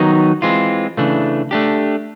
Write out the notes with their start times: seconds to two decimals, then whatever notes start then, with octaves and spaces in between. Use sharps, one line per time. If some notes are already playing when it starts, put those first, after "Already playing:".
Already playing: D#3 F#3 B3 D#4
0.42 E3 G#3 C4 F4
0.97 C#3 E3 A3 D4
1.51 A3 D4 G4